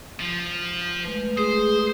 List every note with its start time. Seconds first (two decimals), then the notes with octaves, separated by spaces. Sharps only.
0.20 F3
1.03 G#3 A3 B4
1.38 G#4 C5